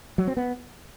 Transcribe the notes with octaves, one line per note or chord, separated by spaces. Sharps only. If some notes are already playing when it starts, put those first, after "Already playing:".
F#3
C4
B3